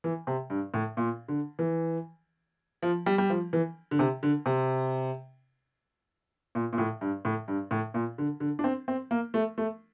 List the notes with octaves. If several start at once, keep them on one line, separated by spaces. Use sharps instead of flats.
E3
C3
G2
A2
A#2
D3
E3
F3
G3
G3
F3
E3
D3
C3
D3
C3
A#2
A#2
A2
G2
A2
G2
A2
A#2
D3
D3
D4
C4
C4
A#3
A3
A3